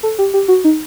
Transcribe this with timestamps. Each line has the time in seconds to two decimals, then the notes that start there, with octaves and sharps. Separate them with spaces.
0.03 A4
0.19 G4
0.34 G4
0.48 F#4
0.64 D#4